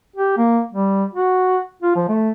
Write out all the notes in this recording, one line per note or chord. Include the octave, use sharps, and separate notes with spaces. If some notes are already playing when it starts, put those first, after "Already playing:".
G4
A#3
G3
F#4
F4
F3
A3